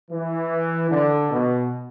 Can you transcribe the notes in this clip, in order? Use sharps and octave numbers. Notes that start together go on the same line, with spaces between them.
E3
D3
B2